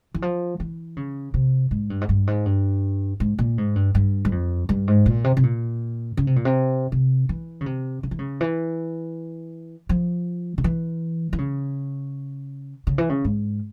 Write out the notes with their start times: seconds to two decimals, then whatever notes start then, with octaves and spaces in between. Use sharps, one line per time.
0.14 E3
0.22 F3
0.60 E3
0.97 C#3
1.34 C3
1.71 G#2
1.90 G2
2.01 G#2
2.09 G2
2.27 G#2
2.45 G2
3.20 G#2
3.39 A#2
3.58 G#2
3.76 G2
3.95 G2
4.25 G2
4.32 F2
4.69 G2
4.88 G#2
5.06 A#2
5.24 C3
5.37 C3
5.43 A#2
6.17 C#3
6.27 C3
6.36 A#2
6.45 C3
6.92 C3
7.29 E3
7.61 C#3
7.66 C3
8.03 C#3
8.11 E3
8.19 C#3
8.41 E3
9.89 F3
10.58 C#3
10.64 E3
11.33 E3
11.38 C#3
12.87 C#3
12.98 E3
13.09 C#3
13.25 G#2